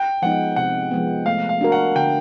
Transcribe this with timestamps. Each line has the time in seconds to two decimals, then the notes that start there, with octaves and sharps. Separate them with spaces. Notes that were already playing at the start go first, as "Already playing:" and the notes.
Already playing: G5
0.22 F3 G#3 B3 D#4 F#5
0.56 C3 F#5
0.91 F3 G#3 B3
1.26 A3 F5
1.49 F5
1.61 D4 F#4 A#4
1.72 F#5
1.95 D3 G5